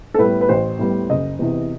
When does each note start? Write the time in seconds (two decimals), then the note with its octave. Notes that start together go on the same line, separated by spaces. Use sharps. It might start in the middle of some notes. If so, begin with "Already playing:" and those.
0.14 A4
0.19 A2 G3 B3 B4
0.41 B4
0.49 A1 C5
0.79 A2 G3 B3
1.10 F#1 D#5
1.39 E2 C3 E3